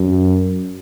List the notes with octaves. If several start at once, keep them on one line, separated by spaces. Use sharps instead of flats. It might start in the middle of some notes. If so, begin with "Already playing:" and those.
Already playing: F#2